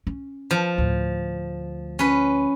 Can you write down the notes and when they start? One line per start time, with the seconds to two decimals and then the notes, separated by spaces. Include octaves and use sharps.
0.07 C#4
0.51 F3
0.78 D2 A2
1.99 C#4 B4